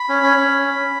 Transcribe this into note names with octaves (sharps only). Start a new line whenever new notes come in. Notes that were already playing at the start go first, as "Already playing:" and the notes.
Already playing: B5
C#4
C#4
C#4